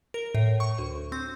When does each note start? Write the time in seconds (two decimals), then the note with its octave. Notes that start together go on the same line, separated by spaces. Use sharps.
0.14 A#4
0.35 A2
0.60 C#6
0.78 D2
1.12 C4